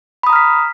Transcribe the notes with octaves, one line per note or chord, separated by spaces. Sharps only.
A#5 B5 D#6 F6 B6